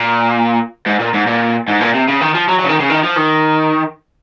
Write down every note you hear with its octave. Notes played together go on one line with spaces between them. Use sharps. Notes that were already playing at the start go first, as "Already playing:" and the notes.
Already playing: A#2
G#2
A#2
G#2
A#2
G#2
A#2
C3
C#3
D#3
F3
F#3
F#3
C#3
D#3
C#3
D#3
F3
D#3